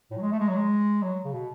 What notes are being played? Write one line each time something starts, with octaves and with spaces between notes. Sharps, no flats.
A2
F#3
G#3
A3
G#3
F#3
G#3
F#3
C#3
B2